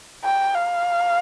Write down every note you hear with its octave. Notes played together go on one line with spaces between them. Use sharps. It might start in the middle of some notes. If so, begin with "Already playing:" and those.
G5
F5